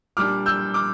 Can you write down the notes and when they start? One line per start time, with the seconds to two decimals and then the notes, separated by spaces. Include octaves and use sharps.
0.17 A#2 G3 D4 D6 F6
0.46 E6 G6
0.74 D6 F6